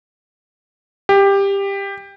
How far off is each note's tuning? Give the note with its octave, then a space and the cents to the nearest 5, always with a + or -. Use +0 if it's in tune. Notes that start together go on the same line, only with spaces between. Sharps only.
G4 +15